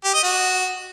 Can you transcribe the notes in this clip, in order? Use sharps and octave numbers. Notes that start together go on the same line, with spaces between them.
G4
D#5
F#4